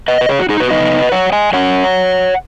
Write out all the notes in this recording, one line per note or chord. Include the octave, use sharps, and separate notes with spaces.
B4 D#5
B4
G#4 C#5
F#4
D#4 G#4
F#4 B4
C#3 B3 D#4 B4 D#5
C#5 F#5
D#5 G#5
F#3 C#4 C#5 F#5